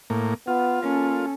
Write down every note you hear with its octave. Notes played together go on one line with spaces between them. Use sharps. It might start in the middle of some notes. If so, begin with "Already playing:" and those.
A2 A#3
B3 F4
A#3 C#4 A4